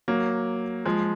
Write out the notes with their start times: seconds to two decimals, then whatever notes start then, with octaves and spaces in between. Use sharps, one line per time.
0.08 F#3 A#3
0.85 F3 G#3